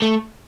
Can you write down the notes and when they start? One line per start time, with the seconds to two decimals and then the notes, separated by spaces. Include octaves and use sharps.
0.02 A3